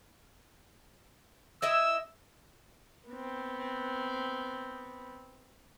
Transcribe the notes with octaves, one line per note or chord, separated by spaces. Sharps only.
E4 D#5 E5 E6
B3 C4